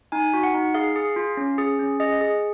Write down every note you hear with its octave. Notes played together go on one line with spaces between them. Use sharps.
D#4 G#5
F#4
F#5
D#4
G#4 F5
G#4
F4
C#4
G#4
C#4
G#4 D#5
G#4